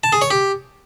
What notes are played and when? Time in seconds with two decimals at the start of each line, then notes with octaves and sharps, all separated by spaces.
0.04 A5
0.13 G#4
0.22 C#5
0.31 G4